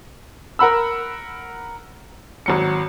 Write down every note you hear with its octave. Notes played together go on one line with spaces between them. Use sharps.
A#4 F#5 B5 E6
G#1 F#3 C#7